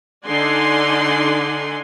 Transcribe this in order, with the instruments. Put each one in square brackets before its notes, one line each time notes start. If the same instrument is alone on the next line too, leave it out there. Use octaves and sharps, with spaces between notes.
[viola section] D3 D#4 D5 F#5 G#5 C6